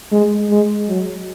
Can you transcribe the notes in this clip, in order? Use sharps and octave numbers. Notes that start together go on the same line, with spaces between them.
G#3
G#3
F#3